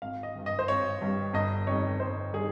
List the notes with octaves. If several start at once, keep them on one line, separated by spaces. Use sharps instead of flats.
G#1 F5
D#5
G2 G3
D#5
C5
G#1 C#5
G2 G3
G1 D#5
F2 D#3 G3 C#5
G1 C5
D#3 G3 G#4